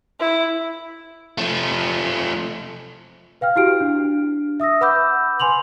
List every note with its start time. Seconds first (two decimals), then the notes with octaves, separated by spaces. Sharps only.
0.19 E4
1.38 F3 A3
3.41 B4 F5 G5 F6
3.56 E4 F#4 G4 F6 D7
3.80 D4
4.60 E5 D#6 E6 A#6
4.81 B4 F#5 B5 D6 E6 G6
5.40 B4 G#5 C6 F7 F#7